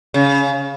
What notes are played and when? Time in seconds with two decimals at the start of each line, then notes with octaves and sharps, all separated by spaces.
0.14 C#3